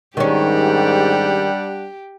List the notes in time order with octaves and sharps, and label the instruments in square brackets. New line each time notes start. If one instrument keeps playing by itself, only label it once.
[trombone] G#2 [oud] D#3 C#4 [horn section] G3 D4 F#5 [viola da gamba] G4